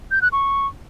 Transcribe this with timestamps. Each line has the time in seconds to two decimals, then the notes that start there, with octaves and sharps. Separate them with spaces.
0.11 G6
0.22 F#6
0.32 C#6